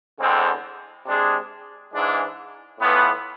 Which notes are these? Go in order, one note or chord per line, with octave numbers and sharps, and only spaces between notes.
E2 D3 G#3 C4
C3 G#3 D4 G#4
G#2 E3 G#3 D4
A2 E3 B3 F4